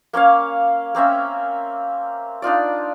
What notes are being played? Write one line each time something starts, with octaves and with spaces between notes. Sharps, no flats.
A#3 C#4 C#5 F5
A#3 C4 C#4 E5
D4 D#4 F4 D5